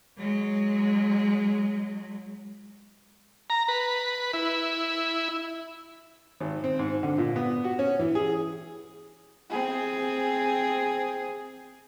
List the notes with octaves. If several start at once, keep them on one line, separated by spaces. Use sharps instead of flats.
F#3 G#3
A#5
B4
E4
G#1
C4
G#2
D3
A#2
B3
F#4
C#4
E3
G#4
C4 G#4